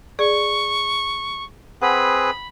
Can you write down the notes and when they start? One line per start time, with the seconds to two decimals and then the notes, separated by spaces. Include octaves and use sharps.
0.19 G#4 D5 C#6
1.82 C4 G#4 B4 F#5 G#5 B5